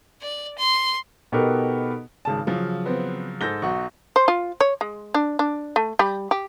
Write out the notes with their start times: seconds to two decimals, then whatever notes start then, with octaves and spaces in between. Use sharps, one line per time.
0.22 D5
0.58 C6
1.32 B2 B3 D#4 G4 A4 A#4
2.25 G#1 C#3 A5
2.47 C#3 F3 F#3
2.85 B3 C4
3.41 G#2 A4 G6 A#6 G7
3.62 B1 F#4 C#6
4.16 C5
4.28 F4
4.61 C#5
4.81 G#3
5.14 D4
5.39 D4
5.76 A3
5.99 G3
6.31 G4